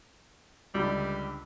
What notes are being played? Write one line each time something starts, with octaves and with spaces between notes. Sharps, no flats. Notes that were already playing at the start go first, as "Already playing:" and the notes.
C#2 D3 G3